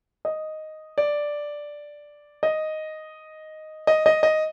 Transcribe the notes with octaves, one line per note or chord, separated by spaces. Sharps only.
D#5
D5
D#5
D#5
D#5
D#5